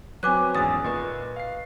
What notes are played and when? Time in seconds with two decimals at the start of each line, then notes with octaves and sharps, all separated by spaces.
0.23 F#3 C4 F#4 B4 C#5 G#5 D6 F#6
0.55 G#1 E2 C#4 G#4 G#5 D#6 A6
0.84 A#2 B4 D#5 C#6
1.36 F5 C7